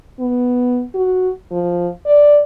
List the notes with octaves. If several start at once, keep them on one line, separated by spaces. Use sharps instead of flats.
B3
F#4
F3
D5